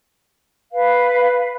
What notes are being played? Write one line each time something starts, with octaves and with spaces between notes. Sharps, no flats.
B4 F5